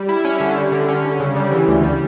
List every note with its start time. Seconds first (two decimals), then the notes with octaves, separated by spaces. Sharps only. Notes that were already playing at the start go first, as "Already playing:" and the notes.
Already playing: G3
0.09 E4
0.24 C#4
0.40 D3
0.56 G3
0.72 D3
0.88 C#4
1.04 D3
1.20 C#3
1.36 G3
1.51 E3
1.68 D2
1.83 G3